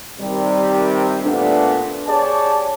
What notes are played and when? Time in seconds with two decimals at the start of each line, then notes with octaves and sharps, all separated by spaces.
0.20 C3 D#3 G3
1.23 A#2 A3 B3 D4
2.07 G4 G#4 C#5 D5 A5